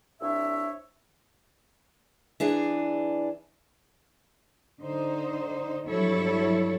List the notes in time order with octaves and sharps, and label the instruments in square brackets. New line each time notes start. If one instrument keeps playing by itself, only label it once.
[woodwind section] C2 D4 C#5 E5
[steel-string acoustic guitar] E3 D4 G#4
[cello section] D3 D#4 C5
G2 F3 F#3 E4 A4 C#5